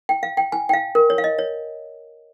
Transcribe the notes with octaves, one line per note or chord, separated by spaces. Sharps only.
G5
F5
G5
G#5
G5
F5
A#4
C#5
F5
D#5
C#5